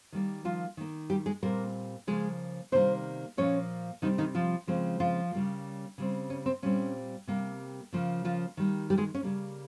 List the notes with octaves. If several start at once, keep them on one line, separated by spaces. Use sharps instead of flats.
D#3 G3 A#3
F3 F4
D#3 A#3
G3 G4
G#3 G#4
A#2 G3 A#3 C4 A#4
C#3 F3 G#3 A#3 G#4
C3 D#3 G3 A#3 C4 C5
A#2 F3 A#3 C#4 C#5
C3 D#3 G3 C4 D#4
D#3 D#4
F3 F4
C#3 F3 G#3 C4
F3 F4
C#3 G3 A#3
C#3 G3 C4
C#4
C4
A#2 G3 C4 C#4
C3 G3 A#3
C#3 F3 A#3
F3 F4
D#3 G3 A#3
G3 G4
G#3 G#4
C#4
C#3 G3 A#3